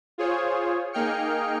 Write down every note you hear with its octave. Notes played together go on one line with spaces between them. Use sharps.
F4 G#4 C5 C#5
A#3 D#4 G#4 G5 F6 C#7